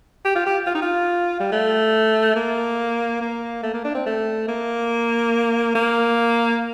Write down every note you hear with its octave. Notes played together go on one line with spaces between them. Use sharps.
G4
F4
G4
F4
D#4
F4
G3
A3
A#3
A#3
A3
A#3
D4
C4
A3
A#3
A#3